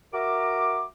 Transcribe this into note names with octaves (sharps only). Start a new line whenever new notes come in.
F#4 A#4 E5 A#5 D6